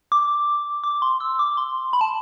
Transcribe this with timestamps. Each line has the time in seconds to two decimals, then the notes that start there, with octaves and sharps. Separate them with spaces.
0.12 D6
0.84 D6
1.02 C6
1.20 E6
1.39 D6
1.57 C6
1.93 B5
2.01 A5